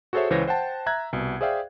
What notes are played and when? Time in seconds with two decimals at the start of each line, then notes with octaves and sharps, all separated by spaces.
0.13 F#4 G#4 A4 C5 C#5 E5
0.30 C#2 E3 C5 C#5 A#6
0.48 C5 F#5 G5 A5
0.86 E5 A#5 F#6 G#6
1.13 C2 B2
1.41 G#4 C5 D5 E5 F5 G5